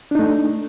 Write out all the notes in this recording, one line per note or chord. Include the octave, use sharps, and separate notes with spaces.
A3 D4 D#4